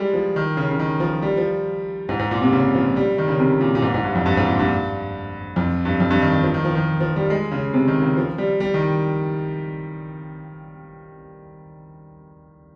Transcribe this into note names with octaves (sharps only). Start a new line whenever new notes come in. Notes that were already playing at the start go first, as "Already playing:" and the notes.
Already playing: G3 G#3
F3
D#3
C#3
C#3
D#3
F3
G3
F3
G#2
G#2
A#2
C3
C#3
F3
G3
D#3
C#3
C3
A#2
A#2
G#2
G#2
G2
F2
G2
G#2
A#2
G2
F2
G2
F2
G2
D#3
D#3
F3
D#3
F3
D#3
F3
G3
G#3
C#3
C3
D#3
C#3
F3
G3
G3
D#3